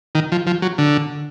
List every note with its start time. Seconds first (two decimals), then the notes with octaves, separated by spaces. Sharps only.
0.15 D#3
0.32 F3
0.47 F3
0.62 F#3
0.78 D3